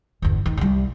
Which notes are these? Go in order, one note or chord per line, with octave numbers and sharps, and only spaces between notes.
G1 E2
D#3
C2 G3